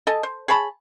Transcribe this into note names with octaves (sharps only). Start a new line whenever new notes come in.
A4 D#5 G#5
C5
G#4 C#5 A5 B5